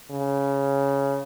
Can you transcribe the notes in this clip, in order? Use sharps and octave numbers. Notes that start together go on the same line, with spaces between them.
C#3